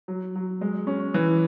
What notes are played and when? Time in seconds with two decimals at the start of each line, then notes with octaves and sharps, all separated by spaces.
0.08 F#3
0.36 F#3
0.61 G#3
0.87 C#4
1.14 E3